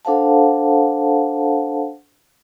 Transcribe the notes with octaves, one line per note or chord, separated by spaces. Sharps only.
D4 A4 C5 F5 F#5 A5